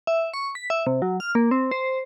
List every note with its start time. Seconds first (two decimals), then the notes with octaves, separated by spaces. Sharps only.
0.07 E5
0.34 C#6
0.55 B6
0.70 E5
0.87 C3
1.02 F#3
1.20 F6
1.35 A#3
1.51 C4
1.71 C5